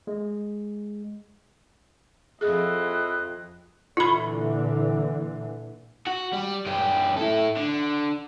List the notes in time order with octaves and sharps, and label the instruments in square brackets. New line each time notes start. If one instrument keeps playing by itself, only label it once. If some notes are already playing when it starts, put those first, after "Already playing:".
[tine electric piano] G#3
[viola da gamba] F2 F3 [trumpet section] E4 D#5 [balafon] G#4 [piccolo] F#6
[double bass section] A#2 D3 E3 [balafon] F4 B5
[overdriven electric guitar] F#4
G3
F#2 G4
E4 A4
D3